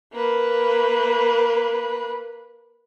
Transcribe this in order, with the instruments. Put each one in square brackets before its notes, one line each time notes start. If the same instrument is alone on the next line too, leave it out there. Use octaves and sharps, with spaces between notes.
[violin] A#3 B4